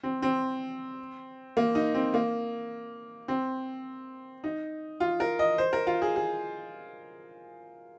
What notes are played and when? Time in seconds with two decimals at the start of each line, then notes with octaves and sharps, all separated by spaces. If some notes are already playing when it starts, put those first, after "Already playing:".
0.03 C4
0.22 C4
1.57 A#3
1.75 D#4
1.94 C4
2.14 A#3
3.28 C4
4.44 D#4
5.00 F4
5.20 A#4
5.39 D#5
5.58 C5
5.73 A#4
5.87 F4
6.02 G#4
6.16 G#4